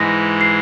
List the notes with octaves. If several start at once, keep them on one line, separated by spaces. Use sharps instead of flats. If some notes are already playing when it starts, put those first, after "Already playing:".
Already playing: G#2 E3 G#3 A#6
C7